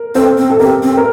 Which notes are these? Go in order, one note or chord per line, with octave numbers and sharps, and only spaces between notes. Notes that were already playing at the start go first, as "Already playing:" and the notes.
Already playing: A#4
C4 A4 C5
C4
A4
C4 G4 A#4
C4
A#4